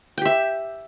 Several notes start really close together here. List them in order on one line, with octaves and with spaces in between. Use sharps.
G5 G4 E5